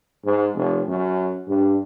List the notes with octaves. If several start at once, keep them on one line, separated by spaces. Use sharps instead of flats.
G#2
F1
F#2
G2